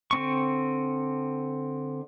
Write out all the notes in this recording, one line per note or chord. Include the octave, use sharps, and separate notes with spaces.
D3 C4 C#6